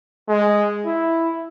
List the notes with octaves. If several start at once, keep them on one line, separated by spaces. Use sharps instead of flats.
G#3
E4